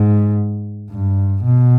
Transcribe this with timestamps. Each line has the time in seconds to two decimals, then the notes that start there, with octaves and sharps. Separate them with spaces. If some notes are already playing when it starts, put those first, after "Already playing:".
Already playing: G#2
0.91 G2
1.44 B2